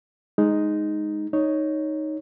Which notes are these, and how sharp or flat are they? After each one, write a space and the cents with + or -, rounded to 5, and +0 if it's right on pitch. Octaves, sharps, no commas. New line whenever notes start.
G#3 +0 D#4 +0
D#4 +0 C#5 +0